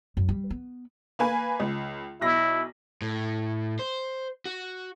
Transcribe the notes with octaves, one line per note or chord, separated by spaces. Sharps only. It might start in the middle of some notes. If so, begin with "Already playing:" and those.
F#2
G3
B3
A#3 B4 G#5
C#2
B1 E4 A#6
A2
C5
F#4